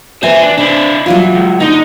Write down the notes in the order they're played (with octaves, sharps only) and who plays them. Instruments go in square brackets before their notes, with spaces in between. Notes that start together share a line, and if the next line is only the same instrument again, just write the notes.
[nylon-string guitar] E3 G#5 [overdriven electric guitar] C5 E5
[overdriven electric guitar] D4
[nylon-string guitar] C3 [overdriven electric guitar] D4 E4
[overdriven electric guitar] E3 [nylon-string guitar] F#3 G3 F4
[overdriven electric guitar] C#2
[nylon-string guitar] D3 D4 [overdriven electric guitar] D#4